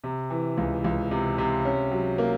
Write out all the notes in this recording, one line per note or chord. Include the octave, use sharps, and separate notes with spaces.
C3
E3
C#2
C#2
C3
C3
C#4
F#3
A#3